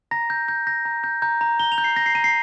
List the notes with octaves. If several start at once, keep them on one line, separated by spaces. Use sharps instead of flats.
A#5 A#6
G6
G6
G6 A#6
A#5
G6
A#5 G6
A#5
A#5 G7
F7
G6
C7
G6 A#6
C7
A#5 D#7
C7